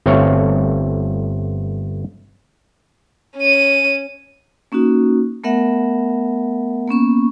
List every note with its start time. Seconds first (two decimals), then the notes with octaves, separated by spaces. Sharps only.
0.06 G1 A3 C4 C#5 F5
3.37 C#4 D#7
4.72 A#3 C#4 D#4 F#4
5.44 A3 B3 A#4 E5 F#5
6.88 A#3 B3 C#4 C#6